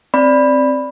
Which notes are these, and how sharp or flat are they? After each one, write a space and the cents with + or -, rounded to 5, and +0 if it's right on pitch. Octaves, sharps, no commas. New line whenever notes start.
C4 +10 D5 +0 B5 +0